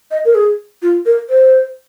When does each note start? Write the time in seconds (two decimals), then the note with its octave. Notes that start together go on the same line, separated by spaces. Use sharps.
0.11 D#5
0.25 A#4
0.35 G#4
0.82 F4
1.06 A#4
1.29 C5